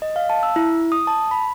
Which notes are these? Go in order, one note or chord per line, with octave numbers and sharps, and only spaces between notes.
D#5
F5
A5
E6
E4
D#6
A5
B5